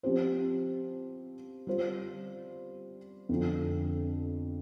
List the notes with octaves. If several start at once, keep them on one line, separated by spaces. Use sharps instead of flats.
F3 C4 G4 C5
G3 F4 C5
F2 D3 F3